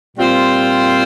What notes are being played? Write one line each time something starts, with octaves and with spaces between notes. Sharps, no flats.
A#2 G3 C4 F4 C5